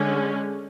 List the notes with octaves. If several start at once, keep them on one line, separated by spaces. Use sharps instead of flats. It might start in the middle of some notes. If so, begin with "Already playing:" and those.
Already playing: D3 G#3 C#4